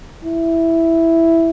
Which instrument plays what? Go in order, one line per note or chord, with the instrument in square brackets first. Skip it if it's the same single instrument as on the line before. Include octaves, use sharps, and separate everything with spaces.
[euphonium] E4